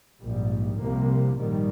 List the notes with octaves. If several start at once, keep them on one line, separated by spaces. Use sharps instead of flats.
A#1 G#2 G3
C2 C3 F3 A#3
A#1 G#2 D#3 G3